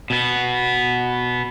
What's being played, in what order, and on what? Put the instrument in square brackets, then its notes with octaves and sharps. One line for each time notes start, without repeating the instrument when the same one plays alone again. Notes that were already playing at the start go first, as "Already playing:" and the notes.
[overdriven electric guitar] B2 B3